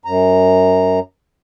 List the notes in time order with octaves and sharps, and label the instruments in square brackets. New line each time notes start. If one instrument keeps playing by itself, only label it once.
[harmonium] F#2 A#5